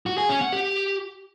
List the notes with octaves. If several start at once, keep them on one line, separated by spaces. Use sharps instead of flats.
F#4
G#4
C#4
F#5
G4